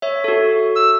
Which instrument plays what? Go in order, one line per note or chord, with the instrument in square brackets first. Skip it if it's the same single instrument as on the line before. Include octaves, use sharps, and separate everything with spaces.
[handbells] C#5 E5
F#4 A4
[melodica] E6